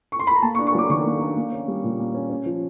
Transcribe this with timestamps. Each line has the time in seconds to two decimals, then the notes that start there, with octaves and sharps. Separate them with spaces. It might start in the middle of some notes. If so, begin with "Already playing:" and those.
0.12 C#6
0.19 C6
0.27 B5
0.36 A#5
0.42 A#3 A5
0.55 C#6
0.59 D4
0.67 C#6
0.75 F#3 D6
0.90 D#3 C#6
1.05 A#3
1.21 D4
1.36 A#3
1.52 C#4
1.68 G3
1.84 A#2
1.99 A#3
2.14 C#4
2.30 C#4
2.46 F3